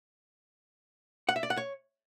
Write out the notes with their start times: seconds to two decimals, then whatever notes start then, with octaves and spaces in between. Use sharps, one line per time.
1.29 F#5
1.36 E5
1.43 D5
1.50 F#5
1.57 C#5